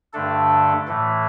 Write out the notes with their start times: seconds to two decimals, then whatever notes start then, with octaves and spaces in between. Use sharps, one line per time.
0.13 G2 D3 A3 D4 A4
0.88 A2 E3 A3